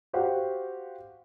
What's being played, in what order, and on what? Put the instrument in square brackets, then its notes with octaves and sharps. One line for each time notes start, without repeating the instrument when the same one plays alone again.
[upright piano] F#4 G4 C5 F5 F#5